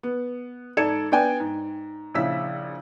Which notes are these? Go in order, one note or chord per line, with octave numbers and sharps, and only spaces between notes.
B3
G#2 A4 D5 G#6 C#7 E7
B3 D4 D5 G5 G#5
G#2
A#1 C#3 E4 E6 B6